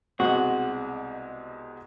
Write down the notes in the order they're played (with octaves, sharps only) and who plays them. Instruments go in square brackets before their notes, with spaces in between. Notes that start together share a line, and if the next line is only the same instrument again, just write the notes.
[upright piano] C2 B2 G#3 C4 [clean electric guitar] F#4